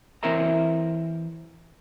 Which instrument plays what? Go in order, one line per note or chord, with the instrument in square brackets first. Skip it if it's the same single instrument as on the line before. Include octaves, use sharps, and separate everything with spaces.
[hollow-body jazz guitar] E3 C4 E4 A#4 E5 A#5